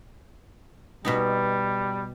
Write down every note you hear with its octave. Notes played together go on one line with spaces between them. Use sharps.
B2 G3 B3 D#4